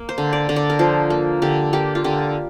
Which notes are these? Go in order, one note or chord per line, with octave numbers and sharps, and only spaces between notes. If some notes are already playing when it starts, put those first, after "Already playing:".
Already playing: A#3
C5
D3
D5
D3
D5
A#4
F3 C5
A#3
D3 G4
A#3 G4
F4
D3 G4